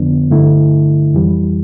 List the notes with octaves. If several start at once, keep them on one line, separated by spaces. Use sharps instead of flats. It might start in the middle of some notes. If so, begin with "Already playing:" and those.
Already playing: F2 D3 F3 B3 D4
G2 D3 A3 E4
F2 E3 G3